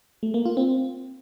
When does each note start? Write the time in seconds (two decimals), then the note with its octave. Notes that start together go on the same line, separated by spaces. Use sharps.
0.23 A3
0.34 A#3
0.46 F4
0.57 C4